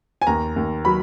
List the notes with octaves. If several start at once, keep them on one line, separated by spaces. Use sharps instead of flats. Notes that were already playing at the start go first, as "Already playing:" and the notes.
G#5
D#2 A#5
D#2
F#3 B5